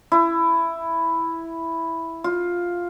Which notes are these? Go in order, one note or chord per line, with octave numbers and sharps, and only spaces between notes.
E4
F4